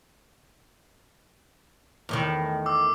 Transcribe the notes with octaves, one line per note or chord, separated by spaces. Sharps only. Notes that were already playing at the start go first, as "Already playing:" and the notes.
E2 A2 D#3
D6 E6